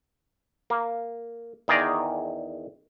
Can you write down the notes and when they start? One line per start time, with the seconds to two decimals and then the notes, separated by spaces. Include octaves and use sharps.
0.70 A#3
1.68 E2 D#3 G#4 D5 A#5